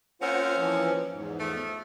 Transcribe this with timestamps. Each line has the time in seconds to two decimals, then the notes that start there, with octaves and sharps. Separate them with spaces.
0.22 A#3 C4 C#4 F4 C5 F#5
0.57 E3 F3
1.12 E2 G#2
1.40 F3 A3